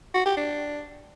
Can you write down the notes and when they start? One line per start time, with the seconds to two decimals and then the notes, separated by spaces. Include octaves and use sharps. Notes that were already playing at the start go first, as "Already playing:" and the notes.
0.15 F#4
0.26 G4
0.37 D4